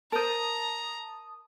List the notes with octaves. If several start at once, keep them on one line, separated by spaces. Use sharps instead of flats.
A#4 C5 A5 A#5 D#6